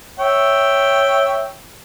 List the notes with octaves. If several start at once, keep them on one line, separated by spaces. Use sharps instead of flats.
C#5 E5 G5